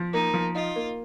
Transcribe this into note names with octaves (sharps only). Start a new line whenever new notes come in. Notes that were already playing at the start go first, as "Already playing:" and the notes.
Already playing: F3
A#3 D#4
F3
D#4 F4
A#3